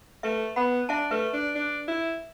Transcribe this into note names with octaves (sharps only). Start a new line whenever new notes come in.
A3 B4 E5
B3 F#5 B5
D4 E5 A5
A3 B4 E5
D4
D4
E4